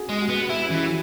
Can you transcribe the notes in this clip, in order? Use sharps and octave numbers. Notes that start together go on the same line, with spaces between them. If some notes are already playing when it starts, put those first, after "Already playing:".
Already playing: F#4 G#4
G#3
F#4
B3
E4 G#4
C#4
E3 E4
F#4